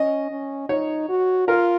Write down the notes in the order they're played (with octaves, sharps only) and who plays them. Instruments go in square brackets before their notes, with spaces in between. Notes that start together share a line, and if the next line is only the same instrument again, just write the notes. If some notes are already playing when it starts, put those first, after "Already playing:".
Already playing: [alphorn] C#4 [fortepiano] D#5
[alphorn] C#4
[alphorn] D#4 [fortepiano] C#5
[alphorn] F#4
[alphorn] F4 [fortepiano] A#4